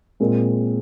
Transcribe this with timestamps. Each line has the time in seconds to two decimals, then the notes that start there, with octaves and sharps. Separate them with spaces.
0.20 A#2 G#3 C4